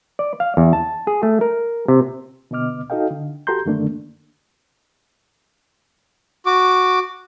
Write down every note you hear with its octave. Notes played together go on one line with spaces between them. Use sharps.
D5
F5
E2
A5
G#4
A3
A#4
C3
B2 D3 B3 D#5 D6 F6
D#4 F#4 A4 D#5 F5 G5
D3
F#4 G4 A4 A#5 C6 G6
F#2 D3 D#3 A3 A#3 D4
F#4 D6